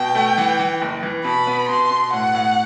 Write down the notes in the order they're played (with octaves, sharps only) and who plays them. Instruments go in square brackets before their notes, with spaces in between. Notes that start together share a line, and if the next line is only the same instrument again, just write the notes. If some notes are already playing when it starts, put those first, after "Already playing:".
Already playing: [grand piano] B2 [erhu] G5
[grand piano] A3
E3
E3
F#1
E3
[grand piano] B2 [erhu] B5
[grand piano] B3
[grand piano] B2 [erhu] C6
[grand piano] B2
[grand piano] A2 [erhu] F#5
[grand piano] A2